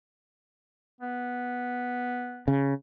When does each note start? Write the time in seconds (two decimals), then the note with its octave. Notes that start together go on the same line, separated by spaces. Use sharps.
1.01 B3
2.48 C#3